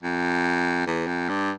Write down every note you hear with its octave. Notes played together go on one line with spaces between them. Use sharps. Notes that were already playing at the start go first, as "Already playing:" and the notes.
F2
E2
F2
G2